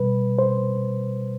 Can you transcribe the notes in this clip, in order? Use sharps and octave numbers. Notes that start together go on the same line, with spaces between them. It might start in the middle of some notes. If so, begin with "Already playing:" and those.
Already playing: B2 G3 B4
C5